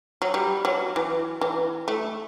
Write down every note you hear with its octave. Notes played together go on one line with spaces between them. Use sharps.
F#3
G3
F#3
E3
E3
A3